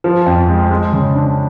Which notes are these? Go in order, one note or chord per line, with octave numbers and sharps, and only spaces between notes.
F3
F2
G#3
G#3
C#3
D4